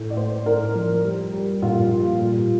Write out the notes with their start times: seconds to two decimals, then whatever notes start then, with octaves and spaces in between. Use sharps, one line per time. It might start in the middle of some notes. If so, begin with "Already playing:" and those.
Already playing: A2 A3
0.10 D5
0.16 A3 C5
0.46 A2 A#4
0.75 F3
1.04 G3
1.33 G3
1.62 A#2 F4
1.91 G3
2.21 A#2